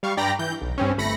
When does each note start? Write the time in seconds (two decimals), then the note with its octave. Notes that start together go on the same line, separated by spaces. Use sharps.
0.03 G3 F5 C#6
0.17 G2 D5 G5 A#5 B5 A#6
0.39 E3 G6
0.62 B1
0.78 G2 C4 C#4
0.97 G1 A3 B5 A#6 C#7